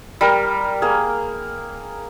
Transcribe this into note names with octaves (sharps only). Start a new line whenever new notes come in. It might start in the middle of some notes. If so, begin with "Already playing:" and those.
G3 A#4
A#3 G#4